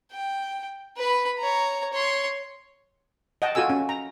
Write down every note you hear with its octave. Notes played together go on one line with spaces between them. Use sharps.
G5
B4 B5
C#5 A#5
C#5 C6
D#5 F#5 G5 A5
F4 F#4 A4 G#5 E6
C#4
A#5